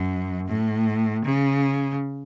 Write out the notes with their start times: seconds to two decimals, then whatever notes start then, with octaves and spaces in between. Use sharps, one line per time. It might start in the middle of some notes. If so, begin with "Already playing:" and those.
Already playing: F#2
0.48 A2
1.25 C#3